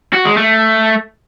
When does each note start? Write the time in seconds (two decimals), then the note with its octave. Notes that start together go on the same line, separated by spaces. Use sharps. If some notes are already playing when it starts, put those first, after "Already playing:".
0.14 F#4
0.25 G#3
0.37 A3